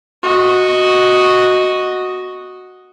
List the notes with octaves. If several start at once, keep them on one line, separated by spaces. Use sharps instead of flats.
F#4 D#5